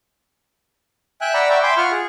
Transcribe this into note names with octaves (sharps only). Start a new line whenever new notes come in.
E5 G5 G#5 F#6
D5 F#5 A#5 B5 E6
D5 E5 F#5 G5 B5 C#6
E5 G5 G#5 B5 C6 D6
F4 F#5 C#6 F6
G#4